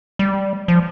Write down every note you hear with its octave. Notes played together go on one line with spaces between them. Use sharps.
G3
F3